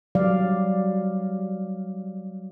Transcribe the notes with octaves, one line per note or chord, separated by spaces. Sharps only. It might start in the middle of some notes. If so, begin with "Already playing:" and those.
F#3 G3 D5 F5